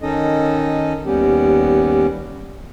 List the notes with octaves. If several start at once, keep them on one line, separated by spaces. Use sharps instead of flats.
D#3 C#4 D#4 A4 D#5
D#2 G3 B3 C#4 G4